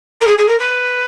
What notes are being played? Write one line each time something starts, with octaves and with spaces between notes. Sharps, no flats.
A#4
G#4
G#4
A#4
B4